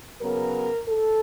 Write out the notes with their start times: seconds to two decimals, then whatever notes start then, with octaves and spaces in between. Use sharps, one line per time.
0.21 C#3 F#3 B3 A#4
0.88 A4